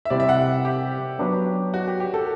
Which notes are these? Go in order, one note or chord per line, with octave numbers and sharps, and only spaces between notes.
E5
C3 G3 C4 E4 D5
E5
F#5
G4
F#3 B3 D4
F#4
G4
G4
A4